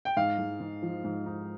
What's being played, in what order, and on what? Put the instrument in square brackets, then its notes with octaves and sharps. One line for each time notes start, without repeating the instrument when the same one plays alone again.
[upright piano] G5
[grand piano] G#2 [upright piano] F5
[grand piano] G#3
G#2
F3
G#2
D#4